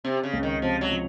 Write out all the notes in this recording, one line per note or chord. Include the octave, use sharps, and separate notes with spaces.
C3 C4
C#3
C#2
D#3
C3 F3
F#3
F3